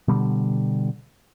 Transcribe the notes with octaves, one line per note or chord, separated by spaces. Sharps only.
B2 D3 G3